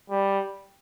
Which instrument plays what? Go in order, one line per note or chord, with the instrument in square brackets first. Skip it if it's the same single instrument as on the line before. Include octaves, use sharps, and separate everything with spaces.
[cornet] G3